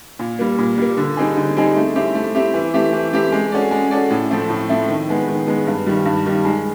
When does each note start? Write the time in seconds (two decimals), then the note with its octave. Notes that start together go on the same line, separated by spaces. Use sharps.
0.19 A#2
0.39 G3 A#3
0.59 A#2
0.78 G3 A#3
0.97 D3
1.17 G3 C4 D#4 G#4
1.37 D3
1.57 G3 C4 D#4 G#4
1.76 A3
1.96 C4 E4 G4
2.15 A3
2.35 C4 E4 G4
2.54 E3
2.74 A3 C4 E4 G4
2.93 E3
3.13 A3 C4 E4 G4
3.32 G#3
3.52 C#4 F#4 A4 D5
3.71 G#3
3.91 C#4 F#4 A4 D5
4.11 A2
4.30 F3 A3 C4 E4
4.50 A2
4.69 F3 A3 C4 E4
4.89 D#3
5.08 G#3 B3
5.28 D#3
5.47 G#3 B3
5.67 G2
5.87 D#3 G3
6.06 G2
6.26 D#3 G3
6.45 G#3